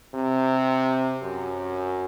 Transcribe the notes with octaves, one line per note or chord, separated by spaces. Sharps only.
C3
F#2